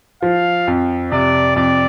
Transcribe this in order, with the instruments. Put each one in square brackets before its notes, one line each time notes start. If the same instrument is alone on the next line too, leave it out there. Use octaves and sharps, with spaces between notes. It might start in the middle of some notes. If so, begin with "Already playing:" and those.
[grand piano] F3 [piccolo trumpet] F5
[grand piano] F2
[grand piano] C3 [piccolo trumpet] D5
[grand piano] F2 [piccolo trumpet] D5